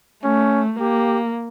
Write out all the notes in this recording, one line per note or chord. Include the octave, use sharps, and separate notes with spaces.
A3 C#4
A#3 G4